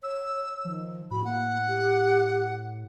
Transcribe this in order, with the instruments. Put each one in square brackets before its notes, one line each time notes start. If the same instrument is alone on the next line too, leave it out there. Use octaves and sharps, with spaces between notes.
[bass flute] C#5 [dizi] E6
[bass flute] D#3 [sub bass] F3
[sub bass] A2 [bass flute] F#4 [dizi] B5
[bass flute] A#3 [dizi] F#5
[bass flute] G4